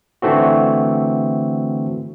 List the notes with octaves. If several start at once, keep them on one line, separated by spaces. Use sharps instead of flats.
D3 E3 A3 C4 F#4